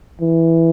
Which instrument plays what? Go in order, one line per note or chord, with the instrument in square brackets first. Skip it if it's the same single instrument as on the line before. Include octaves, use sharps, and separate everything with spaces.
[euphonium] E3